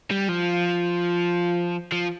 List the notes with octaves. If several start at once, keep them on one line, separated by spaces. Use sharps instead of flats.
G3
F3
F3